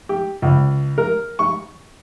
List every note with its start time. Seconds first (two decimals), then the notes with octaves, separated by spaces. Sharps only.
0.09 G4
0.42 C#2
0.98 A#4
1.39 C#6